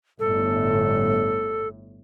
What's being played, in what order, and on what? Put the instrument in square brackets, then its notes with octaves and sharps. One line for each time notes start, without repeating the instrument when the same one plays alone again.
[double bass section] G1 A2 [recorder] A4